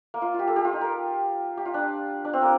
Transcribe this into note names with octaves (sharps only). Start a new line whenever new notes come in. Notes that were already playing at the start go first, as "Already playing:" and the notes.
A#3
F4
F4 G4
A4
G4
F4
D#4
A#4
G4
F4
D4
D4
C4
A#3